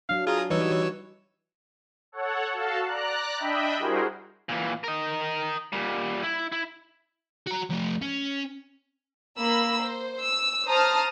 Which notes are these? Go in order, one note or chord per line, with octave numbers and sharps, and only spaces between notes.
F#3 D4 F5
F4 G#4 A#5 D#6
E3 G3 D#4 F#4 B4 C#5 E6
A4 C#5 F#5
F#4 A4 F5 A5
D5 A#5 F#6
D4 D#5 E5 G5 B5
G3 E4 F#4 G#4 A#4 C5
A#2 E3
A#4 D#5
A#2 G3
E4
E4
F#4 A#5
F3 A3
C#4
A#3 B5 E6
C5
E6
C5 A5 A#5 D#6 F6